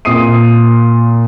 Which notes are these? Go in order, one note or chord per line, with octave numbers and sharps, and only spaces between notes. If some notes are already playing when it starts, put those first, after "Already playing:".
A#2 C4 D#6 C7 D#7